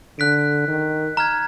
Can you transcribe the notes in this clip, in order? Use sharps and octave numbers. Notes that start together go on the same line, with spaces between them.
D3 F#6 B6 D7
D#3
A#5 F6 G#6